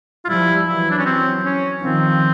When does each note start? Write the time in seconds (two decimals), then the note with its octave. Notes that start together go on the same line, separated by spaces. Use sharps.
0.25 F4
0.28 F3 G3 E4
0.67 E3 F#3 E4
0.91 D4
0.98 C#4
1.05 C4
1.45 C#4
1.83 D#3 F3 C4